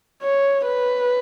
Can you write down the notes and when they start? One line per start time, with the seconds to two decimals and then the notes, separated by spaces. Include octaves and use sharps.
0.22 C#5
0.66 B4